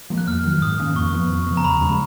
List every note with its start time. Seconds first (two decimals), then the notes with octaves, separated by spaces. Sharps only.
0.10 F3 A#3
0.18 F#6
0.27 F2 F6
0.45 D#3 F#3
0.61 G#2 D#6
0.79 D#3 A#3 C#4
0.95 F2 C#6
1.13 F3 B3
1.30 F2
1.46 C#3 F3 B3
1.57 A#5
1.64 D#2 B5
1.81 C#3 F3 G#3